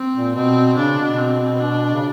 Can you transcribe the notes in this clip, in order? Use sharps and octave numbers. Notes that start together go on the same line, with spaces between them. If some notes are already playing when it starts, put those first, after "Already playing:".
Already playing: C4
A#2
B2 C4
C#3 D4
B2
C4
D4
C#3